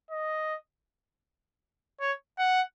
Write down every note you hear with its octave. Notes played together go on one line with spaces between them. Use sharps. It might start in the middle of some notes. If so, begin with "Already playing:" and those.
D#5
C#5
F#5